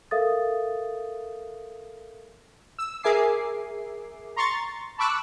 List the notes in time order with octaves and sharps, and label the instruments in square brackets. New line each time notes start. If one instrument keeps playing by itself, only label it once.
[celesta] A4 A#4 E5 F5 D#6 A6
[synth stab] E6
G#4 A#4 E5 G#5 D6 C7
A#5 C6 C#6 A6
A5 B5 C#6 D6 E6 F#6